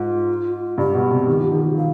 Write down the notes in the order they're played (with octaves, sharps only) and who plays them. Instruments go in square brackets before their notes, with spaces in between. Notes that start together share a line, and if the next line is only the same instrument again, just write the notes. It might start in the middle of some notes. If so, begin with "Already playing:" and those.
Already playing: [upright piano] G#2 [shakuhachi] F4
[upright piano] G2 [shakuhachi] G4
[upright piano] B2
C3
D#3
F3
D#3
F3
[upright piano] D#3 [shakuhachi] F5